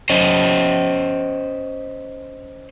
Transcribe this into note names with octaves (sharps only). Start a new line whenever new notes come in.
C#4 C5 D#5